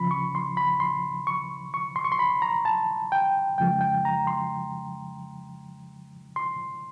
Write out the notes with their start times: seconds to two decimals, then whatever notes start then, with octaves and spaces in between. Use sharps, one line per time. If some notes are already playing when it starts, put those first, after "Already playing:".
Already playing: D2 C#3 F3 B5
0.11 C#6
0.35 C6
0.57 B5
0.80 C6
1.27 C#6
1.74 C#6
1.96 C6
2.04 C#6
2.12 C6
2.19 B5
2.42 A#5
2.65 A5
3.12 G5
3.58 F2 C#3 F3 G#3 G5
3.81 G5
4.05 A#5
4.27 C6
6.36 C6